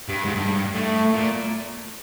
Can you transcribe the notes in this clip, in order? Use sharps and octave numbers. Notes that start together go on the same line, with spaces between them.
G2
G#2
G2
A2
A#2